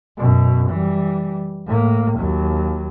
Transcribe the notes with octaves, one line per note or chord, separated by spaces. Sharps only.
F#2 B2
E3 G3
A2 A#3
D#2 F#3